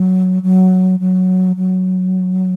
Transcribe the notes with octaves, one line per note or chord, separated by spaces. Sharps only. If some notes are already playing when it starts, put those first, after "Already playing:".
Already playing: F#3
F#3
F#3
F#3